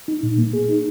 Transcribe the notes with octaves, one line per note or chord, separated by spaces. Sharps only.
D#4
A#2
A#3
G#4
D#4